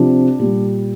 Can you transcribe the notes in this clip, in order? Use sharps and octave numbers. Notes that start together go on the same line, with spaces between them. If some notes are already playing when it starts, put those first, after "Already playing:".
Already playing: C3 F3 D4
A#2 G3